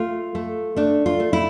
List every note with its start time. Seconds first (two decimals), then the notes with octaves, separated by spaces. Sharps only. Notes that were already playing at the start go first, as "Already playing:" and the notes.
Already playing: A3 F4
0.35 A3
0.76 A3 D4
1.06 F4
1.20 A3
1.33 E4